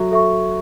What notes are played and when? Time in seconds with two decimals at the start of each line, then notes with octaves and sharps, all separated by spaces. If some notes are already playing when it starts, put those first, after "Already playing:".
Already playing: F#3 A4 E5 C#6
0.12 A4 E5 C#6